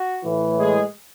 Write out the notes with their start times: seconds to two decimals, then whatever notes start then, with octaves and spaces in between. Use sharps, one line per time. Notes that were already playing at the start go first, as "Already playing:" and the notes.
Already playing: F#4
0.24 A2 E3
0.58 G#3 G#4